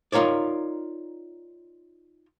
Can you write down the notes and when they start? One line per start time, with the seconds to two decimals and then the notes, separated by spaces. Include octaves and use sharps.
0.12 D#4 F4 A#4 C#5 D5